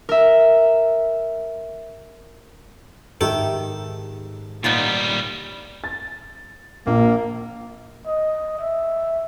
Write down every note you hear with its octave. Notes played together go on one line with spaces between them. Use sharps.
A#4 E5
G#2 D#3 G4 A4 E5
A#2 G3 B3 D#4 F4
A6
A#1 A#3
D#5
E5